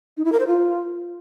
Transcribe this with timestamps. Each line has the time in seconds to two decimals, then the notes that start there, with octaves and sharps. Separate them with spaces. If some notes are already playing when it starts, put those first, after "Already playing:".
0.17 D#4
0.25 E4
0.32 A#4
0.40 C5
0.47 F4